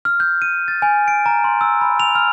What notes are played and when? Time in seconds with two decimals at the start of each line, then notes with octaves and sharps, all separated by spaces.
0.05 F6
0.20 G6
0.42 D#7
0.68 A6
0.82 G#5
1.08 D7
1.26 A#5
1.44 C6
1.61 E6
1.81 B5
2.00 F7
2.15 F6